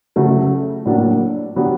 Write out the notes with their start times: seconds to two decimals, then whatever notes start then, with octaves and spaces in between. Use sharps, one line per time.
0.16 C#3 F#3 A3
0.85 A2 F#3 A#3 D4
1.56 F#3 B3 D4 G4